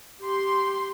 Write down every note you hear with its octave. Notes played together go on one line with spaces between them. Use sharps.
G4 C6